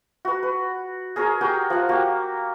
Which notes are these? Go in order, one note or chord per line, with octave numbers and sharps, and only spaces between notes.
F#4 B4
B4
G#4 A#4 C#5 A#5
F#4 G4 A#4 G5
F3 F#5
A#3 F#4 G4